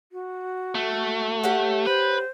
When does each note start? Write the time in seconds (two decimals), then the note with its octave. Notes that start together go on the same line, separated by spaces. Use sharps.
0.12 F#4
0.75 A3
1.44 G4 C#5 F#5
1.86 B4 C5